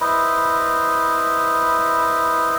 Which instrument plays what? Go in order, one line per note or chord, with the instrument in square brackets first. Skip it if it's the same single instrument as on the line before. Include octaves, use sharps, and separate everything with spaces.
[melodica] E4 B4 C5 D#5